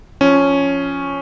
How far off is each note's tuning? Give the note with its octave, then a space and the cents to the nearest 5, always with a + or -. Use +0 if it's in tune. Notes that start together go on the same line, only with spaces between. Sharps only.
F3 -5 C#4 +0